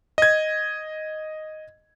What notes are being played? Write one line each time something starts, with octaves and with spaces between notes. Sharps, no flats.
D#5 G#6